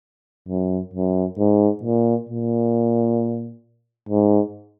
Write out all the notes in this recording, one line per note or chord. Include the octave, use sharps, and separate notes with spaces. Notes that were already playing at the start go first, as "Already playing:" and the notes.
F#2
F#2
G#2
A#2
A#2
G#2